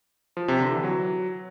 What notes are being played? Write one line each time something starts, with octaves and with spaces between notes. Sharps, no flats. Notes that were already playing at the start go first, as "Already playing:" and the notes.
F3
C3
D3
E3
F#3